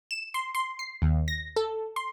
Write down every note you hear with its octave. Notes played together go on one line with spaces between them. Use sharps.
E7
C6
C6
C7
D#2
A#6
A4
C6